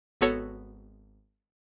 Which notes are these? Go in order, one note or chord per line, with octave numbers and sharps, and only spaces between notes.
G#1 B3 F#4 A4 C#5